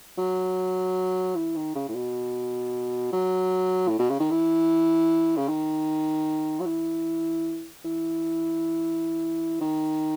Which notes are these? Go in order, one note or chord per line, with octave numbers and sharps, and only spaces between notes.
F#3
E3
D#3
C#3
A2
B2
F#3
A2
B2
C#3
D#3
E3
C#3
D#3
F#3
E3
E3
D#3